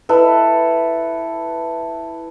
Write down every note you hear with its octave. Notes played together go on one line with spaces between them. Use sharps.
E4 A4 B4